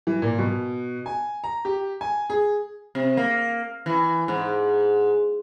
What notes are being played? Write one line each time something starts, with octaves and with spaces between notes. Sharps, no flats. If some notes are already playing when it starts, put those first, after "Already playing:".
E3
A#2
B2
G#5
A#5
G4
G#5
G#4
C3
A#3
E3
G#2